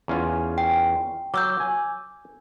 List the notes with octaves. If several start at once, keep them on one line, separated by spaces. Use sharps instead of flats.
E2 C#4 F4
G5
F#3 D6 E6 G6
G#5